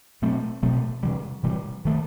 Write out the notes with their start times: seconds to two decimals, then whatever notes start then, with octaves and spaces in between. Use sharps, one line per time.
0.22 B2 F#3 A3 C4
0.62 B2 F#3 A3 C4
1.03 C3 E3 G3
1.43 C3 E3 G3
1.85 D#3 A3